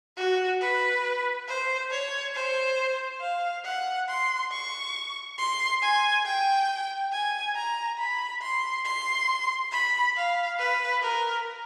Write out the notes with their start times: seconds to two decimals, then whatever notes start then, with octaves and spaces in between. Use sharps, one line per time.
0.17 F#4
0.61 B4
1.48 C5
1.91 C#5
2.35 C5
3.21 F5
3.65 F#5
4.09 C6
4.52 C#6
5.38 C6
5.82 G#5
6.26 G5
7.12 G#5
7.55 A#5
7.98 B5
8.42 C6
8.85 C6
9.72 B5
10.16 F5
10.58 B4
11.02 A#4